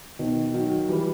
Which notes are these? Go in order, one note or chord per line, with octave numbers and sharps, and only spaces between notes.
B2 D#3
D#3 F#3
E3 G3